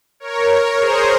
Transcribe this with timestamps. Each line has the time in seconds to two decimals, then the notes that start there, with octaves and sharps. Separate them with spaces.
0.20 A#4 C#5
0.79 G#4 C5